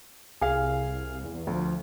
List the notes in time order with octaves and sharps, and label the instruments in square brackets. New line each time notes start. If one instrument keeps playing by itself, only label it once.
[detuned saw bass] C2 [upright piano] G#4 F5
[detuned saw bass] E2
[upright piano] D2 [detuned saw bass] F3